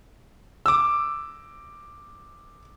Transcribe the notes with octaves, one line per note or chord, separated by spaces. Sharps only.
D6 E6